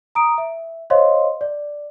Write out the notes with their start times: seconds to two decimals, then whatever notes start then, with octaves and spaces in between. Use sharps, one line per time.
0.15 A#5 D#6 D7
0.38 E5
0.90 C5 C#5 D#5 F5 C6
1.41 D5